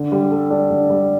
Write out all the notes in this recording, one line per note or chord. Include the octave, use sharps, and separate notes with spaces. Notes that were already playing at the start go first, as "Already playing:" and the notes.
Already playing: D3
G3
A4
D4
D3
G3